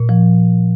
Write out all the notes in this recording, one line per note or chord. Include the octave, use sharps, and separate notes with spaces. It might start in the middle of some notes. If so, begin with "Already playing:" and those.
Already playing: A#2
F3